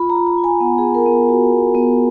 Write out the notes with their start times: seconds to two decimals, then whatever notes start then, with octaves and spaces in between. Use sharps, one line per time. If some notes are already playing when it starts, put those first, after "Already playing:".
Already playing: F4 B5
0.09 A#5
0.16 F4
0.27 A#5
0.38 F4
0.44 G#5
0.60 B3 F#5
0.78 G#4
0.83 B3
0.95 A#4
1.06 B3
1.12 G#4
1.29 B3 F#4
1.52 B3
1.75 B3